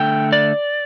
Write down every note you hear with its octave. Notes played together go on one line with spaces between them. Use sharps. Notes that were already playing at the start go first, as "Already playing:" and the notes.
Already playing: D3 A3 G5
D5